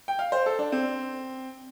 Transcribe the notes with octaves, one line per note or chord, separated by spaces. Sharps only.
G5
F5
C5
A4
D4
C4